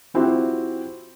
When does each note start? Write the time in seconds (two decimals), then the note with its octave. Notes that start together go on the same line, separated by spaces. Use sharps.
0.14 F3 C4 E4 F#4 G4